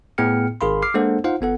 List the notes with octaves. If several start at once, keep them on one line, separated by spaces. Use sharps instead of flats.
A2 B3 G#4 G5 F6 C#7
G#1 G#4 A#4 F5 B5 C6
D6 F6 C7
G#3 A#3 D4 A4 C5 F#5
D#4 F4 C5 F5 F#5
G1 B3 A4 F#5